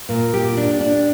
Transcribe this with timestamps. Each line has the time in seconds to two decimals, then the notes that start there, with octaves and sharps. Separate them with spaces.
0.09 A#2
0.34 G4
0.57 D4
0.80 D4